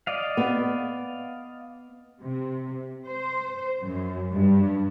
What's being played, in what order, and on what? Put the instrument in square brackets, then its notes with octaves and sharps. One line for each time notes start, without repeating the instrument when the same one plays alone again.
[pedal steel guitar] D5 D#5 F5
[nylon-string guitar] B3
[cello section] C3
C5
F#2
G2